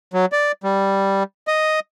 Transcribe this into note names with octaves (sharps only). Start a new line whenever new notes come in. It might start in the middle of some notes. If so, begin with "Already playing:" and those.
F#3
D5
G3
D#5